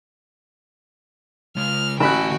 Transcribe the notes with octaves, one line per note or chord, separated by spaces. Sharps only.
C#3 G#3 F6
A1 D2 F#4 G5 A5 B5 F#6